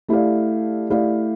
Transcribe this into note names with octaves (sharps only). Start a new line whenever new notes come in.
A3 E4 G4 D5 F5
A3 E4 G4 D5 F5